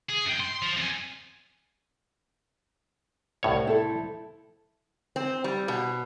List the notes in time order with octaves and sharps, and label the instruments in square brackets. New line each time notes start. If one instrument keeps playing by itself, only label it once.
[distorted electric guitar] G#4
F#2 G5
C6
F3
F2 G#5
[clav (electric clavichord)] C2 A2 C#5
[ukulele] E4 A4 C5
[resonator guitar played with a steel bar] C4
G3
B2